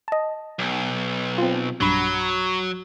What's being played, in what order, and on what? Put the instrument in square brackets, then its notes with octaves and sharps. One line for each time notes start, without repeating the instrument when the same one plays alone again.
[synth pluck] D#5 A5
[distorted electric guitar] B1
[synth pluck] C4 F4
[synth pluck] B1 G2 B5 [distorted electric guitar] F#3